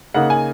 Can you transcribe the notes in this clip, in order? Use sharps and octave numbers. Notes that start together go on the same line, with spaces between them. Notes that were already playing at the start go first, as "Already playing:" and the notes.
C#3 A#3 D#4 F#5
G#5